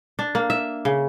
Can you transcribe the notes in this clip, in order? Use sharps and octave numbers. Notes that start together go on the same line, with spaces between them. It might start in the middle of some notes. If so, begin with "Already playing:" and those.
D4
A#3
E5
C#3